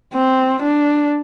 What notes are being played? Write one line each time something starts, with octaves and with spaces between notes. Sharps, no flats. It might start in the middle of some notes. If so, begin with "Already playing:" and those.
C4
D4